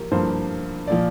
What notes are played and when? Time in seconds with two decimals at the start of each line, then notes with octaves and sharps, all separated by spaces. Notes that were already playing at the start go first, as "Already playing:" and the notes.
Already playing: F3 A#3 G4 A#4
0.12 G2 F3 A#3 C5
0.87 A#2 F3 D5